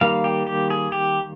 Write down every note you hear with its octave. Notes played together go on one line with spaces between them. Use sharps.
D#3 G3 A#3 F5
G4
G4
G#4
G4